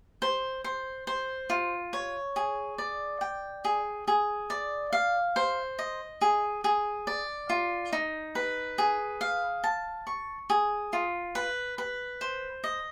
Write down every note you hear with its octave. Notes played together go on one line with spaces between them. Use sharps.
C5
C5
C5
F4
C#5
G#4
D5
G5
G#4
G#4
D5
F5
C5
D#5
G#4
G#4
D5
F4
D#4
B4
G#4
F5
A5
C#6
G#4
F4
B4
B4
C5
D#5